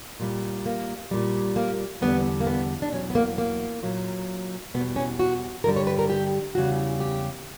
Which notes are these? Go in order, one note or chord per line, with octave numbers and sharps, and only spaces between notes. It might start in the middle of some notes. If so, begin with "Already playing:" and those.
A#2 G3
A#3
A#2 G3
A#3
E2 D3 G3 B3
A#3
B3
D4
E2 B2 F#3 C#4
B3
A#3
A#3
A#2 F#3
E2 B2 G3 B3
C#4
F#4
G2 D3 G3 A#4
C#5
B4
A#4
G4
E2 C#3 G3 F#4
G4